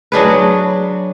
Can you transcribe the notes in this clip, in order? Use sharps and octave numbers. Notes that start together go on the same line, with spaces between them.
F#3 D4 G#4 B4